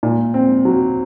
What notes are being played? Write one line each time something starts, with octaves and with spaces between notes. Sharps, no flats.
A#2
C4
F#3